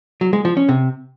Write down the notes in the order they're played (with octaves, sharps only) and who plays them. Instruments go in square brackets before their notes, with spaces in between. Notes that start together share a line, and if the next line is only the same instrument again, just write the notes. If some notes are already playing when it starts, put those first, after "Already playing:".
[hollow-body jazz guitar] F#3
G#3
F3
C#4
C3